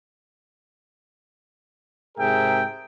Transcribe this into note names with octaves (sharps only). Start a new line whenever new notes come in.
G#2 C3 G#4 A#4 E5 G5